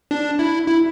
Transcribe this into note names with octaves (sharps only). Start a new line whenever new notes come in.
D4
E4
E4